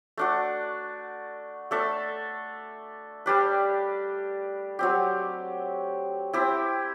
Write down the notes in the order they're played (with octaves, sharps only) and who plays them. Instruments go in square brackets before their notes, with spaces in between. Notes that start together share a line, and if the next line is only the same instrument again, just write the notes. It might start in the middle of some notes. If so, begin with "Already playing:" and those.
[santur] A3 D4 F#4
A3 D4 A4 E5
G3 D4 G4 B4
F#3 C4 G4
C4 E4 G4